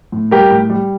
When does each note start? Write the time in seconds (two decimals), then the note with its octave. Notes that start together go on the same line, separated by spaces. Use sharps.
0.12 A2
0.31 G3 G4 A#4
0.51 A2
0.70 G3